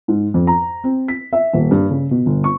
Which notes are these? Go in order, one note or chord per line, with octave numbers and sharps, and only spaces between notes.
G#2
F2
A#5
C4
B6
E5
D#1
G2
C#3
B2
G1
C#6